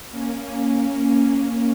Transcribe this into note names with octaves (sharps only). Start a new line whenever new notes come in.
A#3 C#4